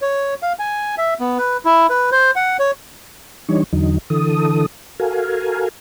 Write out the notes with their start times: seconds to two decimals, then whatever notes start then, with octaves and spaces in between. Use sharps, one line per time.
0.02 C#5
0.42 F5
0.59 G#5
0.98 E5
1.20 B3
1.38 B4
1.65 E4
1.90 B4
2.12 C5
2.36 F#5
2.59 C#5
3.49 E3 G3 D4 D#4 C#5
3.73 E2 D3 F#3 D#4
4.10 D3 E3 A4 D#6
5.00 F#4 A4 A#4 F5 G#5